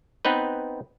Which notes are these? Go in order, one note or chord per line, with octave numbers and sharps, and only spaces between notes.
B3 C4 D#4 B4